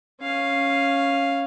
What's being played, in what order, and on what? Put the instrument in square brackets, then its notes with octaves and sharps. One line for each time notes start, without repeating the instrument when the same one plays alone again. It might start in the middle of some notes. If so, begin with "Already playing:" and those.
[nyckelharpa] C#4 F5